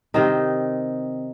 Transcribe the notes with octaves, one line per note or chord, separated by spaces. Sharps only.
C3 D#3 C4 D#4